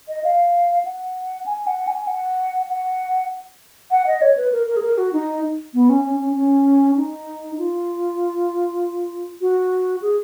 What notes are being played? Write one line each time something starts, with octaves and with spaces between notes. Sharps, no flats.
D#5
F5
F#5
G#5
F#5
G#5
F#5
F#5
F#5
D#5
C#5
B4
A#4
A#4
G#4
A#4
F#4
D#4
B3
C#4
C#4
C#4
C#4
D#4
F4
F#4
G#4